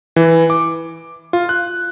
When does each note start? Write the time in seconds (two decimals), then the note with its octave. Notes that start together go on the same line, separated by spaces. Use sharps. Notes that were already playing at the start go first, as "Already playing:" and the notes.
0.16 E3
0.50 D6
1.33 F4
1.49 F#6